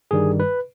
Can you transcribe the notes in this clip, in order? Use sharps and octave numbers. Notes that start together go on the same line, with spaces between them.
G1 G2 D#3 G3 G#4
B4